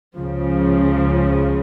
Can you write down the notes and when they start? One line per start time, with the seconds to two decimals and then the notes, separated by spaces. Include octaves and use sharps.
0.18 C#2 C#3 F3